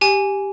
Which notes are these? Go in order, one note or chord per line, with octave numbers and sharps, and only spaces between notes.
G4 G#5